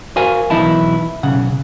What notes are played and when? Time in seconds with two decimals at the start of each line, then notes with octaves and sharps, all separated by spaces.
0.16 F#4 A#4 C5 F5 G#5
0.50 B1 B2 E3 D#4 E4 A5
1.23 B1 C#3 F#5